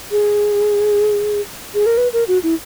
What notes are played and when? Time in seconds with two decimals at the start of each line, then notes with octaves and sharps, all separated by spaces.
0.11 G#4
1.74 G#4
1.86 A#4
1.97 B4
2.13 A#4
2.28 F#4
2.43 E4